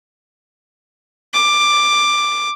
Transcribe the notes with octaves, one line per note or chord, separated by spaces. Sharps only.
D6